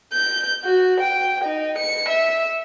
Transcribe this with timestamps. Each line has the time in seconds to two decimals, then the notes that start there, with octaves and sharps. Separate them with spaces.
0.13 G6
0.64 F#4
1.01 G5
1.44 D#4
1.79 C#7
2.09 E5